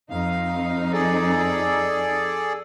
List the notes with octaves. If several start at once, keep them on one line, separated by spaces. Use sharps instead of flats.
F2 D#4 F5
G#4 A4 D5